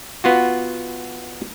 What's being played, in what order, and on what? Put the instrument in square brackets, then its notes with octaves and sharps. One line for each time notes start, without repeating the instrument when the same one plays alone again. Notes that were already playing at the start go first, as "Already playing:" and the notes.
[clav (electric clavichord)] B3 F4 F#4